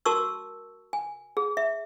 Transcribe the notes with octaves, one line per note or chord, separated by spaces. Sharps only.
F#4 A#4 A5 C#6 E6
G#5
G#4
E5